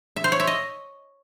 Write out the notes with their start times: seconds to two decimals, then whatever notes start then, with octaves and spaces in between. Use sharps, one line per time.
0.16 E5
0.24 C5
0.32 C#5
0.40 E5
0.47 D#5